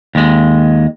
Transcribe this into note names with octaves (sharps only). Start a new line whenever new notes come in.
D#2 G#3